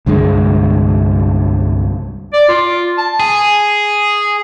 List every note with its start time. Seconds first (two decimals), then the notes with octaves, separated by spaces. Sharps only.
0.06 C2 G2 D3 G#3
2.33 D5
2.49 F4
2.98 A5
3.20 G#4